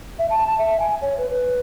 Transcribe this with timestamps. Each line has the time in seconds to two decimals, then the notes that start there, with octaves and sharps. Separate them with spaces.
0.19 E5
0.30 A5
0.47 A5
0.58 E5
0.80 G#5
1.01 C#5
1.18 B4
1.30 B4